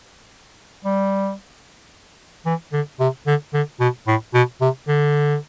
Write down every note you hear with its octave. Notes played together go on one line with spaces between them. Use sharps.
G3
E3
D3
C3
D3
D3
B2
A2
B2
C3
D3